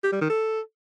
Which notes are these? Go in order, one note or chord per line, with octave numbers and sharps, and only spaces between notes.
G4
G3
D#3
A4